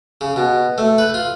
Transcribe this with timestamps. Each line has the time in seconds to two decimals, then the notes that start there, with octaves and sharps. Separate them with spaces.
0.21 C#3
0.36 B2
0.78 A3
0.98 B4
1.14 F4